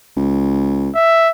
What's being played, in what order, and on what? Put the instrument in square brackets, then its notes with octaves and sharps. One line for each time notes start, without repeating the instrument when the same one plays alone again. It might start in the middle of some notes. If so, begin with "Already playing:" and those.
[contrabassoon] C#2
[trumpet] E5